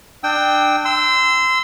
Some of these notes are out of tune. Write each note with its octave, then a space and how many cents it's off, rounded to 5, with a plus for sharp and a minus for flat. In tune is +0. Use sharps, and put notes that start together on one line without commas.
D4 +25 G5 +0 E6 -30
C6 -25 E6 +0